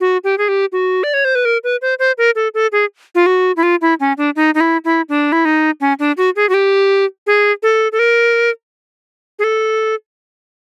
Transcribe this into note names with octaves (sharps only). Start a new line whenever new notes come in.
F#4
G4
G#4
G4
F#4
D5
C#5
C5
B4
A#4
B4
C5
C5
A#4
A4
A4
G#4
F4
F#4
E4
F4
E4
C#4
D4
D#4
D#4
E4
E4
D4
E4
D#4
C#4
D4
F#4
G#4
F#4
G4
G#4
A4
A4
A#4
G#4
A4